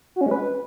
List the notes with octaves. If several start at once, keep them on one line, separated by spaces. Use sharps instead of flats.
F#4
C#4
G#3
B4